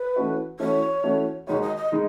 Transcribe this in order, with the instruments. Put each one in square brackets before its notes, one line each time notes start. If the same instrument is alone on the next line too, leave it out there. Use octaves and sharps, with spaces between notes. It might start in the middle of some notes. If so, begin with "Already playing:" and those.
Already playing: [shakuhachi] B4
[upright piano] E3 A3 C#4 F#4
[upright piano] E3 A3 C#4 F#4 [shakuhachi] C#5
[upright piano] E3 A3 C#4 F#4
[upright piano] D#2 D#3 G#3 D#4 F#4 [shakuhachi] C#5
[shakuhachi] D#5
D#5
[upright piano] D#3 G#3 D#4